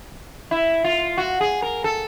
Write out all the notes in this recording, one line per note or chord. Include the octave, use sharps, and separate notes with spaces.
E4
F4
F#4
G#4
A#4
A4